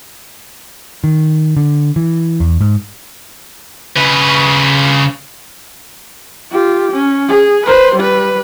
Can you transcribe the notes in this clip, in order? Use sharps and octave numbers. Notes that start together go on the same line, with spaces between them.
D#3
D3
E3
E2
G#2
C#3 B4
F4 G4
C#4
G#4
B4 C5
G3 B4